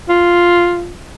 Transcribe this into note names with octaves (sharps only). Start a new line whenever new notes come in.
F4